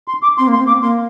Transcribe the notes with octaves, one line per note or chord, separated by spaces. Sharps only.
C6
D6
C4 C6
A#3
C6
C4
A#3 D6
C4
A#3 C6